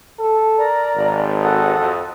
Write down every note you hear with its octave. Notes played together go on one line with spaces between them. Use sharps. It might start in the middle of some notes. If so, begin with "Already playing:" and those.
A4
A#4 D5 A#5
G#1
F#4 A4 D#6
F2